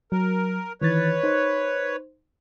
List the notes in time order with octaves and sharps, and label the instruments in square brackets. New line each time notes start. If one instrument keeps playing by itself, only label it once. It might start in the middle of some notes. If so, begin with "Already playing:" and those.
[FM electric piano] F#3 [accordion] A#4
[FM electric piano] D#3 E3 A6 [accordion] B4 C#5
[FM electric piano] D#4 C5